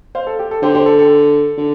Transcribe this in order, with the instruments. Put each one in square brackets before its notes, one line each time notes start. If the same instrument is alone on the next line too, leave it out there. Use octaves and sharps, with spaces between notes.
[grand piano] C5 F5
A4
G4
A4
[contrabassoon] D3 [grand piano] G4 C5
[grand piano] G4 C5
A4
A4
[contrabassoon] D3